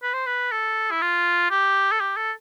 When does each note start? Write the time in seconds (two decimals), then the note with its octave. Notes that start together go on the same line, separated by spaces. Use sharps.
0.03 B4
0.13 C5
0.26 B4
0.51 A4
0.91 E4
1.01 F4
1.51 G4
1.92 A4
2.00 G4
2.17 A4